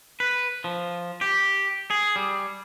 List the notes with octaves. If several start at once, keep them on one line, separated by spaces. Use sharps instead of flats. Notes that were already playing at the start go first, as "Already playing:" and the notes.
B4
F3
G4
G#4
G3